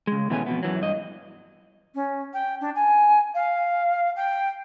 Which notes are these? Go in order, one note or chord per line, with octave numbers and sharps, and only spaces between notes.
C#3 G#3
B2 E3 A3 B3 C#4 G#5
F2 B2 B3
F#2 E3 F#3
G2 D#5
C#4
G5
D4
G#5
F5
G5